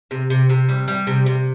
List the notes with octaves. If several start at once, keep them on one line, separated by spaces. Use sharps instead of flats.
C3
C3
C3
G3
G3
C3
C3